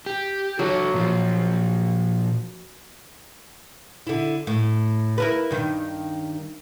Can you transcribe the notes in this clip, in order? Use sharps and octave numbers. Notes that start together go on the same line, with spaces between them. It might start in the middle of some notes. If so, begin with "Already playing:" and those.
G4
F#3 F#4 A4
A#2 F3
D3 E4
A2
E4 A#4 B4
G2 D#3